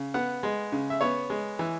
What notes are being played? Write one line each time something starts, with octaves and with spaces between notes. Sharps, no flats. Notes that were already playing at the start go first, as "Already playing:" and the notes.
Already playing: C#3
B3 F#5
G#3
C#3
E5
B3 C#5
G#3
E3